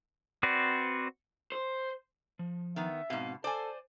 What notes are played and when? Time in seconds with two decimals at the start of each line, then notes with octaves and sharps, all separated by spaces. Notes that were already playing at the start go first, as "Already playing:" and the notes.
0.43 C4 F#4 B4 C5 D5
1.52 C5
2.39 F3
2.76 D#3 B3 E5
3.10 G#2 B2 C4 F5
3.44 A4 C5 D5 G#5